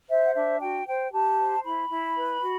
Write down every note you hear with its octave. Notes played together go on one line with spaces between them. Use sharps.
C5 E5
F#5
D4 E5
F#4 G5
C5 G5
G4 A5
C5
E4 B5
E4
B4
F#4